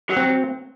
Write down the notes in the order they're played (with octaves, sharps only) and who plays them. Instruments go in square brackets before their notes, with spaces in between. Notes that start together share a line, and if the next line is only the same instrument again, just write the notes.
[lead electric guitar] F#3
[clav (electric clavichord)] C4